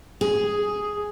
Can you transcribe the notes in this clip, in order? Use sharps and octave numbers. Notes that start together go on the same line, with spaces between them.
G#4